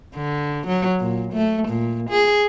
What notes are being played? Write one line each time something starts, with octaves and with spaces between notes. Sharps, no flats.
D3
F#3
A#2
A3
A#2
G#4